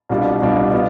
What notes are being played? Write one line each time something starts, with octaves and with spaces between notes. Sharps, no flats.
C2 B2 G3 D4 F4
C2 B2 G3 D4 F4
B3 F4